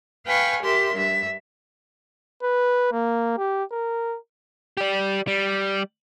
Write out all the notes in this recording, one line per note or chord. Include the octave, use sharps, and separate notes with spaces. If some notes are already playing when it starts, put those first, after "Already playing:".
B4 F5 G5 G#5 C#6
G4 A#4 E5 C6
G2 E5
B4
A#3
G4
A#4
G4 D5
G3